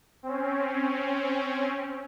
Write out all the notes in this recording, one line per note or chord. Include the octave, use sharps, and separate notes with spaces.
C4 C#4